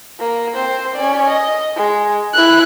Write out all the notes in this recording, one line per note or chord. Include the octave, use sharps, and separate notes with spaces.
A#3
C4 C5
C#4 D5
D#5
G#3
E4 F#6